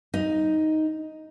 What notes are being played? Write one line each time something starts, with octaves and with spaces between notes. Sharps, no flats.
D#4